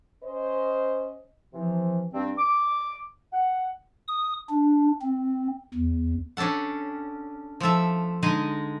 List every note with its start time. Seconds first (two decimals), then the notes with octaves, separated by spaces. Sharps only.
0.24 C#4 C5 D#5
1.54 C3 E3 F3
2.13 G2 C4
2.38 D6
3.33 F#5
4.08 D#6
4.49 D4
5.01 C4
5.74 E2
6.37 C#4 D4 G4 A4 F#5
7.60 F3 A3 A4 E5
8.23 D3 G#3 D#4 G#4 D#5